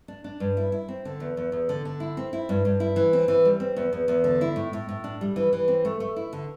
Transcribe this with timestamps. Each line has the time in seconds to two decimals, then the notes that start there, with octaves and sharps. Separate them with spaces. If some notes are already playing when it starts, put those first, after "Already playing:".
0.08 D4
0.24 D4
0.40 G2
0.57 E4
0.72 E4
0.89 C4
1.05 D3
1.20 E2
1.37 E2
1.52 E2
1.69 D3
1.85 D3
2.00 E4
2.17 C4
2.33 E4
2.49 G2
2.65 G2
2.80 E4
2.96 E3
3.13 C4
3.28 E3
3.45 G3
3.60 C4
3.77 E2
3.93 E2
4.08 E2
4.24 D3
4.41 E4
4.56 A2
4.73 A2
4.89 A2
5.04 D4
5.21 G3
5.36 E3
5.53 E3
5.68 C4
5.85 A3
6.00 A3
6.16 E4
6.33 D3